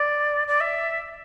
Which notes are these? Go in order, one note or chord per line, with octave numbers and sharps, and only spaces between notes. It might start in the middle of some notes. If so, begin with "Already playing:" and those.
Already playing: D5
D5
E5